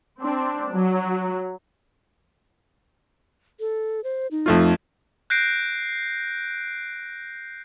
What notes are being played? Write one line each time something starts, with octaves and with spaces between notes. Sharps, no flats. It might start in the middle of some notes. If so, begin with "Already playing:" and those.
C4 D4
F#3
A4
C5
D#4
F2 A3 F4
F#6 G6 A#6 C7 D7